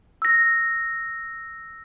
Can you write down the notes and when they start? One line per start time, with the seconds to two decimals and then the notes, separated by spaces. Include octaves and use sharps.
0.22 E6 A#6